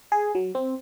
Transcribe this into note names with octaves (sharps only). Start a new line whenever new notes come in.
G#4
F#3
C4